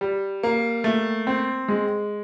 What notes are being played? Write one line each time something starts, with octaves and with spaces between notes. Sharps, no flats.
G3
A#3
A3
C4
G#3